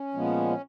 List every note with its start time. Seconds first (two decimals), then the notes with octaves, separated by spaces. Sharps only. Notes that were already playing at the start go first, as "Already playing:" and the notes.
Already playing: C#4
0.14 A#2 F3 G#3 B3